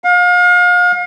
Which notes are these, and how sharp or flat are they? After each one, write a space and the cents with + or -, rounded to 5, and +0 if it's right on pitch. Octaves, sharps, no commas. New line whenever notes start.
F5 +35